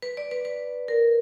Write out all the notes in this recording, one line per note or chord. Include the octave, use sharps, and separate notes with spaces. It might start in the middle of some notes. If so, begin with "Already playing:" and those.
B4
D5
B4
B4
A#4